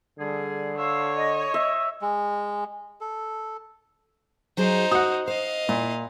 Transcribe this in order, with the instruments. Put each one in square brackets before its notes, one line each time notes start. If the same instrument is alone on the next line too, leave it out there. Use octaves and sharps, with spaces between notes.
[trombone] D3 [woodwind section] G3 G#4
[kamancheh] C#5 [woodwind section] F5 C6 E6
[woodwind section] D#5
[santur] E5
[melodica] G#3
A4
[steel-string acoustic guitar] F#3 F#4 G#4 [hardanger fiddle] D#4 C5
[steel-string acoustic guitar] F#4 [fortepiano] F#5 D#6
[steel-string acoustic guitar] C5 [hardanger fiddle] D#5 F5
[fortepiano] A#2 [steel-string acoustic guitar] E4